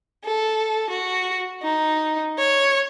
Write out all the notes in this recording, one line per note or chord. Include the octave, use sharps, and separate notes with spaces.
A4
F#4
D#4
C#5